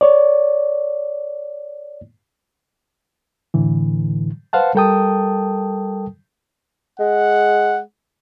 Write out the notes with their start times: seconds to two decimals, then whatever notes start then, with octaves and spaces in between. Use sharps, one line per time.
0.01 C#5 D5
3.54 A2 D3 E3
4.53 B4 C5 F5 F#5 A5
4.75 G3 A4 A#4 G5 A5 D#6
7.00 G#3 F#5